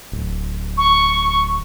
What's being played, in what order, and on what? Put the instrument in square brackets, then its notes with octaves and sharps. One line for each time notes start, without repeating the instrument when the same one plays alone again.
[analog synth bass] D1
[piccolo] C#6